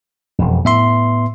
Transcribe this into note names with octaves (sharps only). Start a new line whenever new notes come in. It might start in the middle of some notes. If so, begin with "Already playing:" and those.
E1 F2
A2 B3 E5 C6